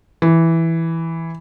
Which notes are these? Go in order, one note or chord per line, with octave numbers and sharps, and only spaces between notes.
E3